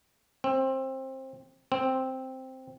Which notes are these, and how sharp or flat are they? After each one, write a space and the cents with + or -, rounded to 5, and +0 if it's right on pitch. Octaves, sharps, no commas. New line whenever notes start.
C4 +20
C4 +0